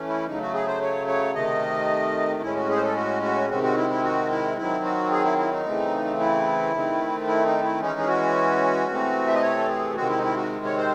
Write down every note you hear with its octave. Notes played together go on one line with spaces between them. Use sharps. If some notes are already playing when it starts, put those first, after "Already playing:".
Already playing: E3 A3 C#4
E4
C#3 F#3 A3 D#4
F#4
G#4
C5
C#5
C#5
C3 D#3 A3 D#5
A2 G#3 C#4 E4
F#4
G#4
C5
A4
F#4
F#4
C3 D#3 G#3 C4 F#4
F#4
E4
E4
F#4
E4
D#3 F#3 C4 E4
F#4
G#4
E4
E4
D#4
C#3 E3 A3 C4
E4
D#3 A3 C4
E4
D#4
E4
E3 G#3 C#4 D#4
G#4
F#4
C3 E3 A3 C4
E5
D#5
C#5
A4
G#4
C3 D#3 G#3 C4 F#4
E4
D#4
E4
F#4
C#5
C5